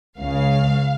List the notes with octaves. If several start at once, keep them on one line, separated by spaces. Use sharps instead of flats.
C#2 C#3 F5